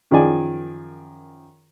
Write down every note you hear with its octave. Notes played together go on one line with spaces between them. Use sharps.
F#2 D#3 F3 G#4 D5 G#5